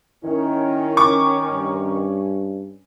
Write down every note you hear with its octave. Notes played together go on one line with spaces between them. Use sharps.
D#3 C#4 E4
C#6 D6
G2